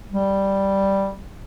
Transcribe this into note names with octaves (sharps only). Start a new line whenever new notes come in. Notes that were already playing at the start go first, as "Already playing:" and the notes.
G3